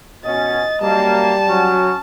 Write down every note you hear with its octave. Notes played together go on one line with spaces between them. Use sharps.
B2 C#4 D#5 A6
F#2 G3 A#3 A5
F#3 C#4